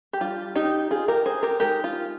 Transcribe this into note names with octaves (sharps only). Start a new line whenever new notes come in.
G4
G3 D4 F4
D#4 G4
F4 G#4
G4 A#4
G#4 C5
G4 A#4
G#3 D#4 G4 A#4
F4